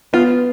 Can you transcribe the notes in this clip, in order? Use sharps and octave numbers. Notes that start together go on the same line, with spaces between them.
B3 F4